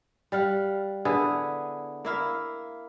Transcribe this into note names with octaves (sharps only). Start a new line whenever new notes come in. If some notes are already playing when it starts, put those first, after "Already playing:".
G3 F5 F#5
D3 B3 E4 G#4
A#3 E4 F5